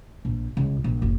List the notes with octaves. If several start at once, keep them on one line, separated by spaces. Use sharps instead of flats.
A#1
C#2
A#1
F#1